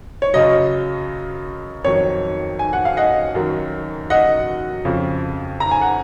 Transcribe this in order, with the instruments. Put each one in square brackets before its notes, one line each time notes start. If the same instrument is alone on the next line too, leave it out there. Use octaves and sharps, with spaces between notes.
[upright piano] C#5
F#2 C#3 F#3 D#5
F2 D#3 F#3 C#5
G#5
F#5
F5
D#5 F#5
F#2 D#3 F#3
D#5 F#5
F2 C#3 F3
A#5
G#5
F#5